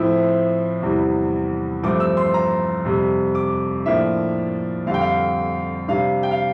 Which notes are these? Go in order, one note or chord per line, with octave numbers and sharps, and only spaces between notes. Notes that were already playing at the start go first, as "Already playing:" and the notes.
Already playing: A2 F3 C4 E4 E5
E2 C3 E3 G3
G2 F3 A3 C4 D6
E6
C6
A#5
F2 C3 G3
D6
A2 F3 A#3 D4 E5
F2 D3 G3 F5
G5
F5
C3 G3 D4 F5
G5
F5